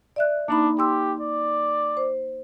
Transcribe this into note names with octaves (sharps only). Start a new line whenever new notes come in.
D5 E5 F#6
A#3 D4 D#4 B5
G4 C6 E6
D5
C5